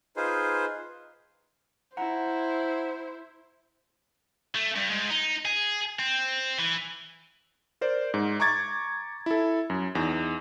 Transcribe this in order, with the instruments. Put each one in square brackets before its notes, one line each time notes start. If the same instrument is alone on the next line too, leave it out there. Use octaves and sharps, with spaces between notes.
[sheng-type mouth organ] D#4 F4 G#4 B4 C5
[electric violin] E4 [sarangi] C5 [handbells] F#5 A#5
[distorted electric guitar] A3
G2
G#2
D#4
G#4
C4
E3
[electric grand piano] A#4 C5 D5
G#2
A#5 C#6 D6 G#6 A6
E4 A4
F#2
E2 D#4 A#5